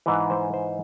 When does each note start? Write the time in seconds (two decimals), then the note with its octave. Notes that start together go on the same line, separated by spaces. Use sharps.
0.06 G#2 E3 B4
0.30 C5
0.54 C5